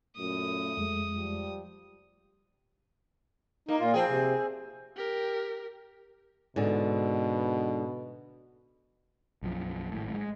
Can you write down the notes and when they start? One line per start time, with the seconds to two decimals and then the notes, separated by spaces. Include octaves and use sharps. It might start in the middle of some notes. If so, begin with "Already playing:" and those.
0.17 F#2 A#2 A3 D#6
0.77 F2 G#3
1.15 F3 G3
3.69 A#3 D#4
3.80 A#2 F4
3.94 F3 C4 G#4 G5
4.08 C3
4.96 G4 A#4
6.56 G#2 B2 D3
9.43 B1 F#2 F3
9.91 G#1 A2
10.14 G#3